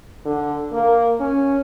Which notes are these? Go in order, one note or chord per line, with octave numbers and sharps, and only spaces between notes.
D3
A#3
C#4